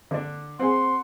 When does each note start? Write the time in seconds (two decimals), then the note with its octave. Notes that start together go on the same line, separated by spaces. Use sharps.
0.11 D3 D4
0.59 C4 G#4 F#5 C6